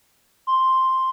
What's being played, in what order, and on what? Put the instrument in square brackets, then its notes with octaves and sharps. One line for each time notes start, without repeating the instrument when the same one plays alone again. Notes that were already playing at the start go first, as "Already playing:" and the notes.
[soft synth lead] C6